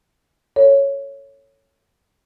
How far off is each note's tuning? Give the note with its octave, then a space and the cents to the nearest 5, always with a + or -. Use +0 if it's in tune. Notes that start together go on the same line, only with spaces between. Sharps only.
A4 +25 C#5 +0